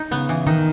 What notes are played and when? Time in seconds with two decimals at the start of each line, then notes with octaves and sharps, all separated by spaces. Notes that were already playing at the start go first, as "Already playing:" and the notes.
Already playing: D#4
0.11 C#3 B3
0.29 E3
0.47 D#3 D#4